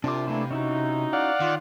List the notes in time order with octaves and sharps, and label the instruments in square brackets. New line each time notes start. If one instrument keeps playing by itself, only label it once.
[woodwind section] C2 F4 [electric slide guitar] C3 [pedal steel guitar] D4 D6
[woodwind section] E3 A#3 E4 [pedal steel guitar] A3 D4
[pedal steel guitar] C#4 E4 F#4 [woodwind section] D#4
[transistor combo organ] D5 F5 F#5
[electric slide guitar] D#3 [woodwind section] F4